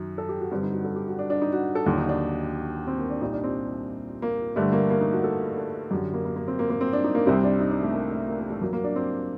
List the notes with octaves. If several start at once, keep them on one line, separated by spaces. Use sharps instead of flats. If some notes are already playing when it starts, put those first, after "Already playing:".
Already playing: F#2 D#3 F#3
A4
G4
F#4
G2 D3 G3 C4
D#4
F#4
A4
G4
F#4
D4
D4
D#4
F#4
A4
D#2 D3 F#3 F#4
D#4
D4
C4
A#3
D4
C2 A#2 G3 D#4
D4
C4
A#3
G2 D3 G3 A3
A#3
A#3
D#4
F#4
A4
A4
F#2 D3 F#3 G4
A#3
A#3
A#3
C4
A#3
A#3
C4
D4
D#4
A#3
C2 C3 G3 C4
D4
D#4
D4
A3
A#3
A3
A#3
A#3
A3
F#2 F#3 A#3
A#3
D4
C4